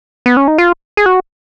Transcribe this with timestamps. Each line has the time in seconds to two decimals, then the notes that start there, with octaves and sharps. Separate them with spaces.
0.26 B3
0.37 C#4
0.48 D#4
0.58 F4
0.97 G#4
1.06 F#4